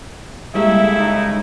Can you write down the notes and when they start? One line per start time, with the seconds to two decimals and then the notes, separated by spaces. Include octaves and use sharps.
0.54 A2 C#3 G3 G#3 A#3 E4 E5
0.99 D#4